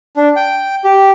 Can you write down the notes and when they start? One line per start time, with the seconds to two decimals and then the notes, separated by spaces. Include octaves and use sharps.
0.17 D4
0.36 G5
0.84 G4